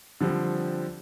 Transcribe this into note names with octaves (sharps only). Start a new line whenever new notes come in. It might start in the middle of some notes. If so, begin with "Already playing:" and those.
D3 F3 G3 C4